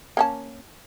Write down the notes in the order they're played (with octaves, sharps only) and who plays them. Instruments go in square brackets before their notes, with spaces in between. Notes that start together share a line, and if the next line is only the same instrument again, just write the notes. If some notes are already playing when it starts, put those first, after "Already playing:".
[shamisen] A#3 C#4 A5